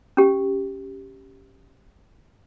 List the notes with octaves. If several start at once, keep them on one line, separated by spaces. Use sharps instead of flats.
C#4 G4